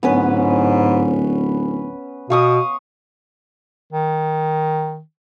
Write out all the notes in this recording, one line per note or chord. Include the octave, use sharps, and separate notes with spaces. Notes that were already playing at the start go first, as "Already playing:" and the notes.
D1 G#2 B3 C#4 B4
B2 F5 C#6 D#6
D#3